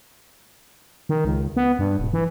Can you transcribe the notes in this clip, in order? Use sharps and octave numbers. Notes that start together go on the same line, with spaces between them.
D#3
C#2
B3
G2
D#1
E3